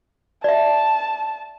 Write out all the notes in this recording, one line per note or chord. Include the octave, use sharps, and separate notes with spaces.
D5 E5 A5